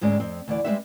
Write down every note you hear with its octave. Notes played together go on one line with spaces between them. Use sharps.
D2 G#2 G#3 C#4 D5
F2 C4
D2 E3 D5
G3 G#3 C4 F#4 B4 E5